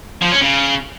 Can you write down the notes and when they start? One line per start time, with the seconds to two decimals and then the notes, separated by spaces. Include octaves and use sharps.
0.22 F3
0.32 C#4
0.42 C#3